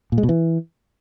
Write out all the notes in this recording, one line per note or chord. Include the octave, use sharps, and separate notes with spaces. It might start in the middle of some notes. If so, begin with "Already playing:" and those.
A#2
G#3
B2
E3